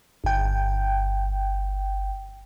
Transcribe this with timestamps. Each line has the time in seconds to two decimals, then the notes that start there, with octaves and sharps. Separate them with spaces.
0.24 G1 G5